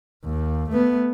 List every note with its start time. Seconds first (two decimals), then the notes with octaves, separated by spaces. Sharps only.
0.25 D#2
0.70 A3 B3